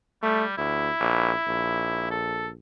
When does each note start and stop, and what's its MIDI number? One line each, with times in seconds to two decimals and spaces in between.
0.23 0.55 55
0.23 0.44 57
0.57 0.90 38
0.57 2.07 64
1.00 1.32 34
1.47 2.56 34
2.11 2.47 69